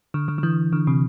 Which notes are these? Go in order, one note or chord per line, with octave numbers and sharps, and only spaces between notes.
D3
D3
D3
E3
D3
C3